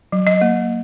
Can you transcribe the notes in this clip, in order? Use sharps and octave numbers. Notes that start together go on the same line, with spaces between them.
F#3
D#5
A#3